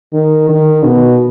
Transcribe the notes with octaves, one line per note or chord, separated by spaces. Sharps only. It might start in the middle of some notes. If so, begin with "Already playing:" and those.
D#3
D#3
B2